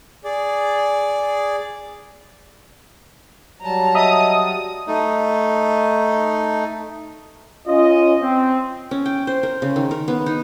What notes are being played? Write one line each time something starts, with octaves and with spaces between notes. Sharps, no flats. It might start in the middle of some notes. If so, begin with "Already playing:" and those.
G#4 D5
F#3 G3 A5 A#5
D#5 E5 D#6
A3 D#4
C#4 F4 D#5
C4
C#4
G5
C5
A#4
C#3
D#3
A#4
B3
D#4